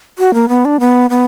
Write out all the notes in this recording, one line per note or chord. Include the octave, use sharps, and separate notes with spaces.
F#4
A#3
B3
D4
B3
B3